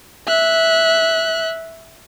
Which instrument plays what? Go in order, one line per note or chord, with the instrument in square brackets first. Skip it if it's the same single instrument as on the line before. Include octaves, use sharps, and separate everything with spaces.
[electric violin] E5 F#6